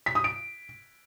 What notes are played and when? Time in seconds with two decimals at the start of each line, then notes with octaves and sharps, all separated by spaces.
0.06 B6
0.15 D#6
0.24 D7